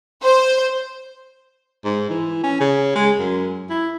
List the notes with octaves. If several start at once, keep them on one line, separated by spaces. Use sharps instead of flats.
C5
G#2
E3
C#4
C#3
G#3
F#2
E4